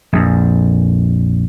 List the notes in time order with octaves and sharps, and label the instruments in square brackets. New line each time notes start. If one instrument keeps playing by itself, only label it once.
[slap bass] A#1 F2